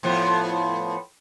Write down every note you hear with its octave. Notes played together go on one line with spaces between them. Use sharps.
A2 F3 B3